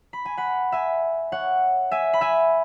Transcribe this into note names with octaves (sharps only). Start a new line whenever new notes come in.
B5
G#5
F#5 B5
E5 G#5
C#5 F#5
E5 G#5
B5
E5 G#5